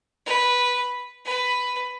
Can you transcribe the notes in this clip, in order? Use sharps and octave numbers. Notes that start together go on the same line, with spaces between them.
B4
B4